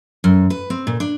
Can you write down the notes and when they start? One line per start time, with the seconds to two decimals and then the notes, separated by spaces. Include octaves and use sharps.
0.24 F#2
0.50 B4
0.70 C4
0.87 A#2
1.00 D4